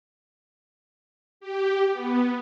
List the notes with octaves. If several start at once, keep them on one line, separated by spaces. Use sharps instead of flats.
G4
B3